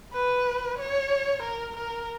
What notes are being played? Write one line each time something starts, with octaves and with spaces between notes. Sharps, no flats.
B4
C#5
A#4
A#4